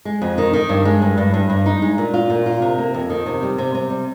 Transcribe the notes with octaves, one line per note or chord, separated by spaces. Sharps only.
G#3
F2
D#3
D#3
G2
G#3
G2
G2
G2
G2
D#4
G#3
A#2
F4
A#2
F4
C3
A#3
F2
D#3
C3
G3
C3
C3
G3